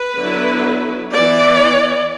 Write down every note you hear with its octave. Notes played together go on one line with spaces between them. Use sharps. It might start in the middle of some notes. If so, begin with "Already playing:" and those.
Already playing: B4
D3 F#3 B3 E4
E3 B3 E4 D5